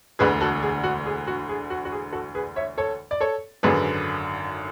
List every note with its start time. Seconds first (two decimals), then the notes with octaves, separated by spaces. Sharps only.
0.19 E1 D2 D3 G#4 B4
0.41 F#4 A4
0.62 G#4
0.84 F#4
1.06 G#4
1.27 F#4
1.49 G#4
1.70 F#4
1.85 F#4
1.92 G#4
2.12 F#4 A4
2.35 G#4 B4
2.56 C#5 E5
2.78 A4 C#5
3.11 D5
3.21 A4 C#5
3.63 G#1 F#2 D3 G#4 B4